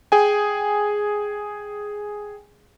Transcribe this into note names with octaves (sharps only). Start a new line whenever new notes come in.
G#4 G5 G#5